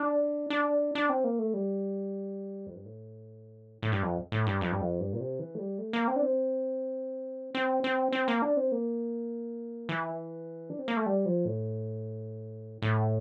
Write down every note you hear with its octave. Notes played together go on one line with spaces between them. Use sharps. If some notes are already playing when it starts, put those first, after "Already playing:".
Already playing: D4
D4
D4
C4
A#3
A3
G3
F2
G2
A2
A2
G2
F2
A2
G2
F2
G2
F2
G2
A#2
C3
E3
A3
G3
A3
A#3
C4
D4
C4
C4
C4
C4
A#3
D4
C4
A#3
E3
D4
C4
A#3
A3
G3
F3
A2
A2